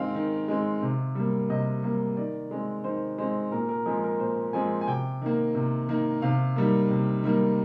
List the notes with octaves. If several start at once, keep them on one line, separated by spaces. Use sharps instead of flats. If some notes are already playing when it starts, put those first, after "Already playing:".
Already playing: D#3 G#3 C4 F5 G5
D#3
G#3 C4
C3
G3 A#3
C3 D#5
G3 A#3
D#3 D5
G#3 C4
D#3 C5
G#3 C4 C5
A#2 A#4
A#4
F3 G#3 C4 G#4
A#4
A#2 C5
F3 G#3 C4 G#5
G#5
C3 G5
D#3 A#3
C3
D#3 A#3
C3 F5
D#3 G3 A#3
C3
D#3 G3 A#3